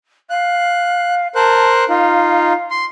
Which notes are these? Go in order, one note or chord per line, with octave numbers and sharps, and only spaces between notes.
F5 F#6
A#4 C5 A5 F#6
D#4 F4 F5
C6